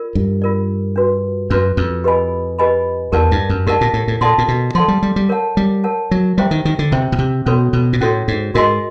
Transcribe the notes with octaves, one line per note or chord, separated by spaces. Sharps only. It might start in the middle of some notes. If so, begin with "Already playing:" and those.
Already playing: F4 A#4 D5
G2
F4 A#4 D5
D4 F#4 B4
F#2 D4 F#4 B4
F2
G4 B4 D#5 G#5 B5
G4 B4 D#5 G#5 B5
E2 G4 A#4 D5 F#5 A5
G2
F#2
G#2 G4 A#4 D5 F#5 A5
A#2
A2
A2
A#2 A4 D5 F#5 A5 C6
A#2
B2
F3 A4 D5 F#5 A5 C6
G3
G3
G3
A#4 C#5 F#5 A5
G3
A#4 C#5 F#5 A5
F#3
G3 E4 G4 C5 E5 G5
D#3
D#3
D3
C3 E4 G4 C5 E5 G5
B2
C3
B2 C#4 F#4 A4 C#5
B2
A#2
A2 C#4 F#4 A4 C#5
G#2
G#2 F#4 A#4 D#5 G#5 C6